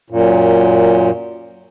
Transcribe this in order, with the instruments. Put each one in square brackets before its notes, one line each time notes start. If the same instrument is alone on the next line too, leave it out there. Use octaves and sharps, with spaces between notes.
[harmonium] F#2 A#2